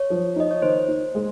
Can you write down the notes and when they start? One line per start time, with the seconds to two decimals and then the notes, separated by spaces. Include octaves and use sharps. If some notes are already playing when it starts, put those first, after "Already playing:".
Already playing: C#5
0.10 F3
0.36 D#4 D#5
0.51 C#5
0.62 D#3 C5
0.88 D#4
1.15 G#3